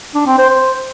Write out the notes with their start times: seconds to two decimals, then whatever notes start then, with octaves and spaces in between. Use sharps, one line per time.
0.15 D4
0.27 C4
0.38 C5
0.50 C5